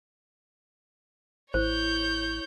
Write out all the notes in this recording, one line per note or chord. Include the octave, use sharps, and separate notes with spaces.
A1 E4 C5 C#5 G6